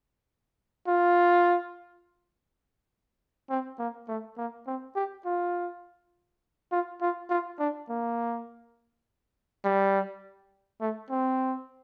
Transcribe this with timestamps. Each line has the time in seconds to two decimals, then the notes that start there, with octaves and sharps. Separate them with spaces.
0.88 F4
3.50 C4
3.79 A#3
4.08 A3
4.38 A#3
4.67 C4
4.96 G4
5.25 F4
6.72 F4
7.01 F4
7.30 F4
7.59 D4
7.89 A#3
9.65 G3
10.81 A3
11.10 C4